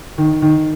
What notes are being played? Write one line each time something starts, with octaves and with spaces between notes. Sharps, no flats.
D#3
D#3